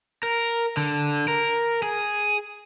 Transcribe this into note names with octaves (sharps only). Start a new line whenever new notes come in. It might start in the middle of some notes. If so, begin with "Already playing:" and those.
A#4
D3
A#4
G#4